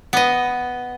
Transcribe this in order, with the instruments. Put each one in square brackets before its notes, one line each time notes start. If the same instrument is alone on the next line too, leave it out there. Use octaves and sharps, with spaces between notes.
[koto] B3 D#5